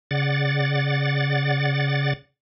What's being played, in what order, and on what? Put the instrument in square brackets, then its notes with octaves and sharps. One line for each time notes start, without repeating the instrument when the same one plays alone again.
[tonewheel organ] C#3 D5 F#5 A6